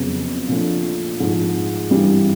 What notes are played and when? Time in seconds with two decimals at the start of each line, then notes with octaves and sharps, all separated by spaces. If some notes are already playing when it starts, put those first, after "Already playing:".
Already playing: F2 C#3 F#3 B3
0.48 A#2 F3 A3 D4
1.20 G#2 F3 G#3
1.91 G2 E3 G3